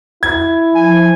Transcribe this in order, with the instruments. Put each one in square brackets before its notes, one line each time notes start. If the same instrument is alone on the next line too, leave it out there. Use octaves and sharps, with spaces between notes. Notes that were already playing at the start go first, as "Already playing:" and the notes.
[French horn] E4 [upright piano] G#6
[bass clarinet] F3 [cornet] G#5